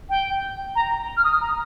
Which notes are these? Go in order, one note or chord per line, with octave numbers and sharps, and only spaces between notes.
G5
A#5
F6
D#6
A#5